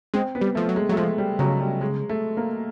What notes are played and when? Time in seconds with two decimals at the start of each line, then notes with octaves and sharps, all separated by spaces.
0.14 G#3 C4
0.35 B3
0.41 G3
0.55 F3 A3
0.69 F#3
0.76 G#3
0.89 F#3 A3
0.97 F3 G#3
1.18 G3
1.39 C#3 F#3
1.60 G3
1.81 G#3
2.09 A3
2.37 A#3